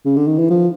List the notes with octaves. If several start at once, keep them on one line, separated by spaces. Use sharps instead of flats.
C#3
D3
D#3
E3
F3